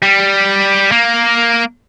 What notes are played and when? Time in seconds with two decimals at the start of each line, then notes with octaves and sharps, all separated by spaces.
0.03 G3
0.92 A#3